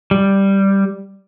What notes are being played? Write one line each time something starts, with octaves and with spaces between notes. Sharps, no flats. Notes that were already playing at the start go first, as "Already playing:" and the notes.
G3